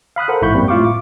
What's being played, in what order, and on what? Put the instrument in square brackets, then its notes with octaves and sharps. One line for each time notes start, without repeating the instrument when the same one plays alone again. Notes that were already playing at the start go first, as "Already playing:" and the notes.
[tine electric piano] F5 B5 D#6 F#6
A4 A#4 C5 F#5
A1 G#2 E4 B5 C#6 G6
F#2 G3 A#3 C4
A2 E4 F4 F5 C#6 D6
D6